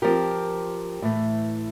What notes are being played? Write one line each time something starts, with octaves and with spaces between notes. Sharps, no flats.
F3 C4 G4 A#4
A2 E3 A3